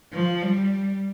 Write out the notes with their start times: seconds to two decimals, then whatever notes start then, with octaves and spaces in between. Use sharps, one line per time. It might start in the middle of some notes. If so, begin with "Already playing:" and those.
0.13 F3
0.42 G3